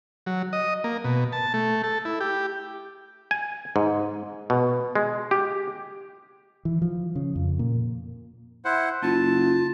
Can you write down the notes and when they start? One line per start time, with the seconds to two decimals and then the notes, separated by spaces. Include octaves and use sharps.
0.26 F#3
0.53 D#5
0.84 A#3
1.04 B2
1.32 A5
1.54 A3
1.84 A4
2.05 E4
2.20 G4
3.31 G#5
3.76 G#2
4.50 B2
4.95 G#3
5.31 G4
6.65 E3
6.82 F3
7.15 C#3
7.35 F2
7.59 A#2
8.65 E4 C5 F#5
9.02 F#1 F4 A5